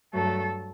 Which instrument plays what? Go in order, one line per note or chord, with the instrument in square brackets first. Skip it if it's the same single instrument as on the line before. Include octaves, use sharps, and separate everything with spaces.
[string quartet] G2 F#3 A3 A4